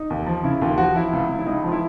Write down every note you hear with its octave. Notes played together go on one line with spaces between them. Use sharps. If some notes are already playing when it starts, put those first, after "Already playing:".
Already playing: D#4
D#2
F3
C#3 E4
D#2 F4
F3 F#4
F3 E4
C#2
C#2
E4
C#2 D#4
F3 F4
E4